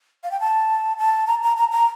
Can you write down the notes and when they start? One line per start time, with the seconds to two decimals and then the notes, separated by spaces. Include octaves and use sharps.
0.24 F5
0.31 G5
0.40 A5
0.98 A5
1.27 A#5
1.43 A#5
1.57 A#5
1.72 A#5